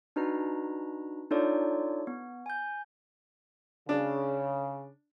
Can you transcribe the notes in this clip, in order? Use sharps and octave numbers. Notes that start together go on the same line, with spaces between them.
D4 D#4 F#4 B4 A#5
D4 D#4 F4 A4 C#5 D5
B3
G#5 G6
C#3 D4